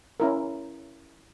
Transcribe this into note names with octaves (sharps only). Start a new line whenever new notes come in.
C#4 E4 A#4